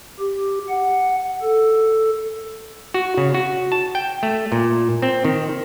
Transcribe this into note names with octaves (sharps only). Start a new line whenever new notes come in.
G4
F#5
A4
F#4
C#3
F#4
A5
G5
A3
A#2
C4
D#3